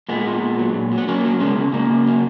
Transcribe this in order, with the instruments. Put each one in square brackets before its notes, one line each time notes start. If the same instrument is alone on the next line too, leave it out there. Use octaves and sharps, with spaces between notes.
[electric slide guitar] A#2 G#3 B3
A#2
A#2
F#3
A#2
F#3
B3
F#3 A#3 C#4
F#3
C#3 G#3 B3
C#3
C#3 A#3
C#3
F#3